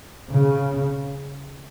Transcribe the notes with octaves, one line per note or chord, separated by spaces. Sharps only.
C#3